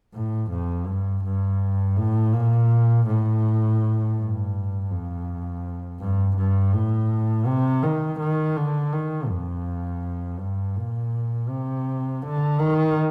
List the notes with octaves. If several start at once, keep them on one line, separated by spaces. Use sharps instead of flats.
A2
F2
G2
G2
A2
A#2
A2
G2
F2
G2
G2
A2
C3
D#3
D#3
D3
D#3
F2
G2
A#2
C3
D3
D#3